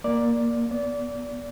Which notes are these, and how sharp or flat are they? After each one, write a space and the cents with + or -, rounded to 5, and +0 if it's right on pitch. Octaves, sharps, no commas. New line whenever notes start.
A#3 +10 D5 +0
B3 -20 D5 -25